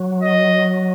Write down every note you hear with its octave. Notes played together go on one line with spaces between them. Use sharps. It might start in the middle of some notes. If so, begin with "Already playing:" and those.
Already playing: F#3
D#5